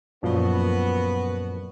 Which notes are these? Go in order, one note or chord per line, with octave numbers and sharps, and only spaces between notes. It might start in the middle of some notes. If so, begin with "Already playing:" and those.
F#2 A#2 F3 B3 F#4